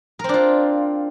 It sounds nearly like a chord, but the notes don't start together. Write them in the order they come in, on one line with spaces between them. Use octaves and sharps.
A#4 C4 D4 F4